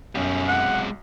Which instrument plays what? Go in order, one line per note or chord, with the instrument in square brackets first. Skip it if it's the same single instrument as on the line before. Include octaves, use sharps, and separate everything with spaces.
[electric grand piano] B1 [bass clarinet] F#2 [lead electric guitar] G3 C#4
[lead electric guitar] C3 G#3 [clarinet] F#5